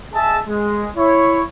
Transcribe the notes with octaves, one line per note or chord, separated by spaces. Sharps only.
G#4 D#5 E5 A5
G#3
E4 C#5